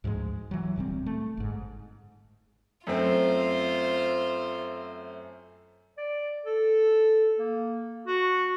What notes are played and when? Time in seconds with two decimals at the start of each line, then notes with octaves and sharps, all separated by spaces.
0.04 D2 G#2 F3 G#3
0.51 E3 F#3
0.76 D1 A#2 G3 C4
1.06 A3
1.37 G1 G#2
2.87 F#2 A3 C4 F4 C5
5.98 D5
6.45 A4
7.39 A#3
8.07 F#4